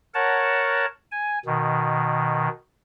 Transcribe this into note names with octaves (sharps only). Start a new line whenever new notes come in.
A#4 C#5 F#5 A5
G#5
B2 D#3